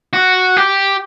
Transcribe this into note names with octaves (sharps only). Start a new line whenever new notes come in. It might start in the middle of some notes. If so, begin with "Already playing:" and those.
F#4
G4